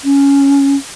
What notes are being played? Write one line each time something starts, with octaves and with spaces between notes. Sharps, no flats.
C#4